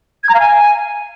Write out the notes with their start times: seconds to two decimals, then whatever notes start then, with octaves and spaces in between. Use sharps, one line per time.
0.23 G#6
0.29 A#5
0.34 F5
0.40 G#5